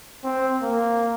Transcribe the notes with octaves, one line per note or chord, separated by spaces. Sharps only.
C4
A#3